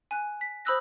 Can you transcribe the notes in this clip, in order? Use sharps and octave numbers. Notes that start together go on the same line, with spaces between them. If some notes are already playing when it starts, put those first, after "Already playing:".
G#5 F#6
B6
C5 B5 D#6 E6 F#6 A#6